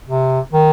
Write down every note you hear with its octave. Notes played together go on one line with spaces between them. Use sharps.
C3
D#3